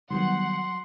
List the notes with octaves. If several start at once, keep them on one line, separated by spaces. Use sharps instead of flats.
D#3 F#3 G3 B3 F#5 C6